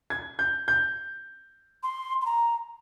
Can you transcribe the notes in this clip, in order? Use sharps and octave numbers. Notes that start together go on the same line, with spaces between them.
G#6
G6
G6
C6
C6
A#5